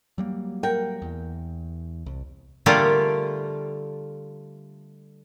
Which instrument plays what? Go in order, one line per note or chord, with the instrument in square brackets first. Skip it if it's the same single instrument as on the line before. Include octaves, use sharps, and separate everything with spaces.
[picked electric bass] F#3 G3 A#3
[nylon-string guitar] A#4 F#5 G5
[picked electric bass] E2
C2
[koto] D3 G3 A3 A#3 F4 G4